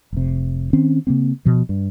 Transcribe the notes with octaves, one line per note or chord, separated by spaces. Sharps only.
F1 C3
D#3 C4 C#4
C#3 A#3 C4
B2 F3
G2